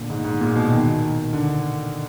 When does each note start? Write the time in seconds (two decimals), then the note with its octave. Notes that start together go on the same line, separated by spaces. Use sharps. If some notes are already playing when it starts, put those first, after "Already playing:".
Already playing: A#2 D3
0.10 G#2
0.24 G#2
0.41 A#2
0.56 B2
0.71 D#3
1.33 D3